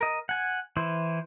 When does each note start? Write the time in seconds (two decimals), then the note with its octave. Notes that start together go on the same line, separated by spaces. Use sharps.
0.01 A#4 D#5
0.29 F#5 G#5
0.77 E3 E4 C5